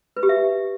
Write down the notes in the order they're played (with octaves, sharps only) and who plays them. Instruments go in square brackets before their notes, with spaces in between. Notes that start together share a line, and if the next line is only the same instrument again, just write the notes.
[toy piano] B4
G4
E5